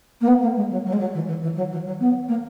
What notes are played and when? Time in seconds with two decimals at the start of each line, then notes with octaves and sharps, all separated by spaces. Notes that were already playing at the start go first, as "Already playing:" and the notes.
0.21 A#3
0.27 B3
0.42 A#3
0.56 G#3
0.71 F#3
0.86 F#3
0.93 G#3
0.99 F#3
1.14 E3
1.27 E3
1.42 E3
1.56 F#3
1.71 E3
1.85 F#3
2.00 B3
2.28 A#3